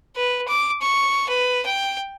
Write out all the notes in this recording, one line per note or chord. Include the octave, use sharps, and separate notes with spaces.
B4
D6
C#6
B4
G5